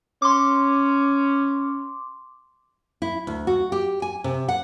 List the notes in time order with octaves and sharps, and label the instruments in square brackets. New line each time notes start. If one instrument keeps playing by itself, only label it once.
[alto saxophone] C#4 [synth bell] C6 D6
[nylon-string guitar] E4
D2
F#4
G4
G#5
C3
F#5